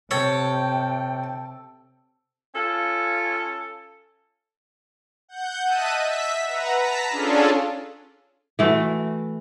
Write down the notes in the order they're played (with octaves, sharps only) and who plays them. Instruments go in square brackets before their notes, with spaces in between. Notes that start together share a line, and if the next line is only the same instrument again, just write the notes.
[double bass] C3 [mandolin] A4 [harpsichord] C#5 [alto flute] G5
[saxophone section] C#4 F4 A4
[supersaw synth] F#5 G6
D#5 E5 A5 F#6 D#7
E5 B6
B4 F#5 A#5
A5 A#5 B6
C#4 D4 F4 G#4 A4
[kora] E3 A3 F#4